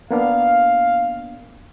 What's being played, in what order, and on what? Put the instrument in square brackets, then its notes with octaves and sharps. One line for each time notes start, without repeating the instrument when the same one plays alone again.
[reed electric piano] A#3 B3 D4 [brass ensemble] F5